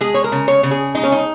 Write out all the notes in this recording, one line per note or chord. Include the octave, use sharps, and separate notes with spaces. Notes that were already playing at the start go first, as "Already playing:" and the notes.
G#3 G#4
C#5
A#4
C#3
C#5
C#3
G#4
G#3 D#4
C#4
D#4